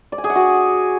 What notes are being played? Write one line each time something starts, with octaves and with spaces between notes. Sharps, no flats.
D5
G#5
G#4
F#5
F#4